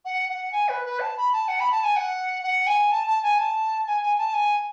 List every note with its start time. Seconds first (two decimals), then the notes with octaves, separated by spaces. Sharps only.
0.05 F#5
0.30 F#5
0.52 G#5
0.69 B4
0.85 B4
1.00 A5
1.17 B5
1.33 A5
1.48 F#5
1.60 B5
1.72 A5
1.84 G#5
1.96 F#5
2.43 F#5
2.67 G#5
2.92 A5
3.07 A5
3.23 G#5
3.38 A5
3.87 G#5
4.03 G#5
4.18 A5
4.34 G#5